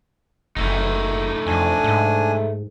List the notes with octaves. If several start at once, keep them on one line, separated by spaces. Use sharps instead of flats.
F#1 A3 D#4
F2 D4 G#5
G#2